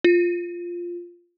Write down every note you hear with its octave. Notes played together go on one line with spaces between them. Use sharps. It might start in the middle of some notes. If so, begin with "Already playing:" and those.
F4